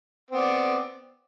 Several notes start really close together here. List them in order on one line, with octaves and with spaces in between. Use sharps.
C4 B3 D5